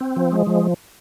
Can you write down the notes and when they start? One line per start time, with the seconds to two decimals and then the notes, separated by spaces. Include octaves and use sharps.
0.01 C4
0.16 F3
0.32 G#3
0.47 F3